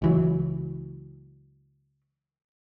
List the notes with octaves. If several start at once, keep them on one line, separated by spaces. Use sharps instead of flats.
C#2 E3 F#3